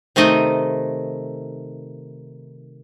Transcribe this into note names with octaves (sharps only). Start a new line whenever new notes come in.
C3 D#3 A3 D#4 D#5